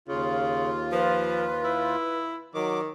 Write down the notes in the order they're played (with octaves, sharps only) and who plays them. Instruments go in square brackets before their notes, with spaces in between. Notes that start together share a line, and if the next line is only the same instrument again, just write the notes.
[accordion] D#2 F4 [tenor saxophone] C#3
[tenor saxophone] F3 [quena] B4
[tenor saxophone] E4
[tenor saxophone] D#3 [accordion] F#3 D6